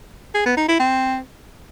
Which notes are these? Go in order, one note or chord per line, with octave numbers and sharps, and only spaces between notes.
G#4
B3
D#4
E4
C4